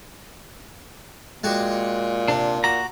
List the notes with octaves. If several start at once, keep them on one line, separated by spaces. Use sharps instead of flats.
A#2 G#3 F#4 G4
C3 D4
F#4 A#5 D6